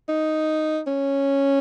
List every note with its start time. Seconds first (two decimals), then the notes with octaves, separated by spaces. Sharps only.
0.09 D#4
0.87 C#4